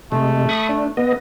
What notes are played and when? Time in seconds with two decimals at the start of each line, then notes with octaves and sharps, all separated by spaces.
0.12 C3 G#3 A3
0.49 B5 C#6 D#6
0.69 D4
0.97 B3 D#5